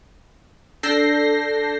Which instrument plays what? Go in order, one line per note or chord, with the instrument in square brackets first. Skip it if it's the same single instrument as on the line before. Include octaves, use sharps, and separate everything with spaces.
[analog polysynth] D4 A4 G6 A#6 C7